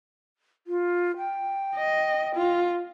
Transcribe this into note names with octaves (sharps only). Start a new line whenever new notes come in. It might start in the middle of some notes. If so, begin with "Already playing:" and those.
F4
G5
D#5
F4